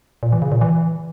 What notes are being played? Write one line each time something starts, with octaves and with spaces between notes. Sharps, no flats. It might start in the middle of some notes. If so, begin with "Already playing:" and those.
A#2
E3
C#3
A#2
E3